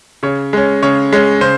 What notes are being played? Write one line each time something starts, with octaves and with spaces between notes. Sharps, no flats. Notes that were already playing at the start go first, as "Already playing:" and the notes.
C#3 C#5
G#3 C#4
C#3 C#5
G#3 C#4
C#3 C5